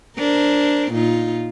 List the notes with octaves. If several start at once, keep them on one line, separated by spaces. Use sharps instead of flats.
D4 A#4 C5
A#2 D#4 F4